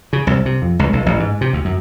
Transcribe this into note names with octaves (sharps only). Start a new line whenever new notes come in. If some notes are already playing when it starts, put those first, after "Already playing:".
C#3
C2
C3
F2
C#2
B1
A1
G#2
C3
D2
F#2